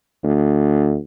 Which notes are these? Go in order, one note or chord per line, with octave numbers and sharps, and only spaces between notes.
D2